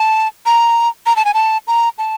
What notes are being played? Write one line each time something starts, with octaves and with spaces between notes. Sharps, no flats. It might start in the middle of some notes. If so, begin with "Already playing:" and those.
Already playing: A5
A#5
A#5
A5
G#5
A5
A#5
A5